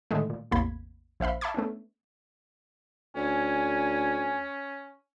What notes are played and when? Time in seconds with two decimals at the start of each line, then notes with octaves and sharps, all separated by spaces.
0.11 A2 D3 D#3 G#3 A3
0.30 A#2
0.51 A1 E2 C3 A#3 B5 G#6
1.20 A#1 C5 E5 F5 B5
1.41 E5 A5 B5 C#6 D6 G#6
1.54 A3 B3 C#4 D4
3.16 D2 C#4 G#5